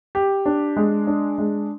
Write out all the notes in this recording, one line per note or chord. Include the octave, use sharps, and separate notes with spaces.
G4
D4
G#3
D4
G#3